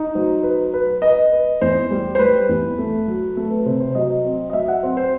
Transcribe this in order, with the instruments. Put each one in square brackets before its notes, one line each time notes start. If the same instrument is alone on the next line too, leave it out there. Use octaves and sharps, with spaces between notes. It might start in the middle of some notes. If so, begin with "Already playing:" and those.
Already playing: [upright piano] D#4
[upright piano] F#3 [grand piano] C5
[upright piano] B4
B4
[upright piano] B4 [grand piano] D#5
[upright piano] B4
[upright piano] E2 [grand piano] C5
[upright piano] G3
[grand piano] C5
[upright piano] G3 [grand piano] B4
[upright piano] E2
A3
F#3
[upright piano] A3 [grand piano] A4
[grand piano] B4
[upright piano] C3 [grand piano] C5
[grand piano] C5
[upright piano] F#3 [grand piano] D#5
[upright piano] C4
[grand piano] D#5
[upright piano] F#3 [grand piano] E5
[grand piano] F#5
[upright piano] C4
[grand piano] C5